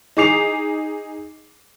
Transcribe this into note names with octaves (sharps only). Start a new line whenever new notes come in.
D#4 G#4 D6 C7 F7